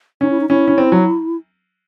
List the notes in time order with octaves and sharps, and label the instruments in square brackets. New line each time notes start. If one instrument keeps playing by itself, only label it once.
[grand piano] C#4 [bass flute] D#4
[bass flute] E4
D#4
[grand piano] C#4 [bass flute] E4
[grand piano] C#4
C4
F#3